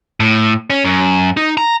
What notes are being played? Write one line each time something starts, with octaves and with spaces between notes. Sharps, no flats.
A2
C#4
F#2
D#4
A#5